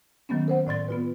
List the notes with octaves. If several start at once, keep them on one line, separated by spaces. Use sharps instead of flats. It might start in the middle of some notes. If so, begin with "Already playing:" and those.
D#3 F#3 A#3 B3 C#4
A#4 C5 F#5
A2 D5 C6 A6
B3 F4 B4